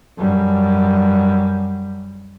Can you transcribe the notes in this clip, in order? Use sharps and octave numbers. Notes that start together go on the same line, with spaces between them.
F#2 G3